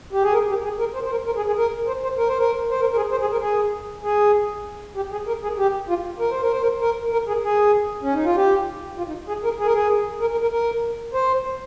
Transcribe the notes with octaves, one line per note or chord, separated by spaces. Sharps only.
G4
G#4
A#4
G4
G#4
A#4
C5
C5
A#4
A#4
G#4
G#4
A#4
C5
C5
A#4
C5
A#4
C5
A#4
A#4
G#4
C5
G#4
A#4
G#4
G#4
G4
G#4
A#4
G#4
G4
F4
A#4
C5
A#4
C5
A#4
A#4
A#4
G#4
G#4
C#4
D#4
F4
G4
F4
D#4
G#4
A#4
G#4
A#4
G#4
A#4
A#4
A#4
A#4
C5